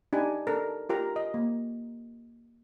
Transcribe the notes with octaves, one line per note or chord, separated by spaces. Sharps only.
D4 D#4 G4 G#5
D4 A4 A#4
F4 G4 A#4 A#5
D#5
A#3